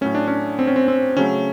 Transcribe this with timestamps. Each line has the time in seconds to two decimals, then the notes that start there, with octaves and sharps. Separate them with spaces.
0.01 A2 F#3 A3 C#4
0.15 D4
0.28 C#4
0.59 C4
0.67 C#4
0.76 C4
0.88 C4
1.17 C#3 F#3 A3 C#4